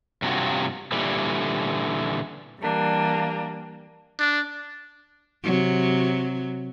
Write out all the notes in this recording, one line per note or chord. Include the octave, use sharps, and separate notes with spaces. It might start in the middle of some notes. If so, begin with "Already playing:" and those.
G2 C3 F#3 A3 F4 F#4
A#2 D3 E3 G3
E3 G3 A#3 D4
D4
C3 F#3